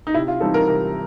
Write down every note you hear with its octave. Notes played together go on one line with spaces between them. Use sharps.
D#4
C3 E4
F4
E3 G3 C4 D#4 A4
A#4
C3 A#4